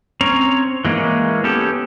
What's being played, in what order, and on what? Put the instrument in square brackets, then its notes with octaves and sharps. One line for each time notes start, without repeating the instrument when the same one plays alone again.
[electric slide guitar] C4 C#4 C#5 A#5
E3 G#3 A#3 B3 C#4
B3 C#4 G4 A4